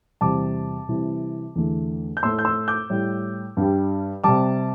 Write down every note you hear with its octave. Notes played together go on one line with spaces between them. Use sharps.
E2 C3 G3 A5 D6
C3 E3 G3
E2 D3 A3
G6
A2 A3 C6 E6
G6
C6 E6
D6 G6
A2 G3
G2
G3
C3 G3 A5 D6